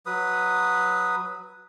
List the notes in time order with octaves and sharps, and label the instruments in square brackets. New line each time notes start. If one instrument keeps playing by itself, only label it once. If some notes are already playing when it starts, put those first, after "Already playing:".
[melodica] F#3 B4 D#6